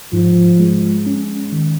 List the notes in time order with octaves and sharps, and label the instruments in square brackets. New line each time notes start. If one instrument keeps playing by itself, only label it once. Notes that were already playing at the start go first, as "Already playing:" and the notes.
[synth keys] G#2 [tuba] F3
[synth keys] G#3
C#4
D#3